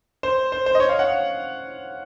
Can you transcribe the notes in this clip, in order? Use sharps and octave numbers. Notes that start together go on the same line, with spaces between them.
C5
C5
C5
D#5
C#5
F5
F#5